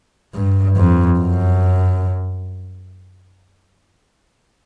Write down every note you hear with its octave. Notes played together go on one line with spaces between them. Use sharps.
G2
F2
F#2